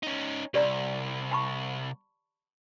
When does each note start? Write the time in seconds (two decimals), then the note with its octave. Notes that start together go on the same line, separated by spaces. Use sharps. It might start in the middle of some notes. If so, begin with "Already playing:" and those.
0.03 C#4 D#4
0.54 C2 G4 D5 A#5
1.31 A5 B5 C#6